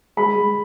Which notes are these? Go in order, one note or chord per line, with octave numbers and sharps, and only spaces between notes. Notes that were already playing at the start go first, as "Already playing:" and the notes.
G#3 B5
G#3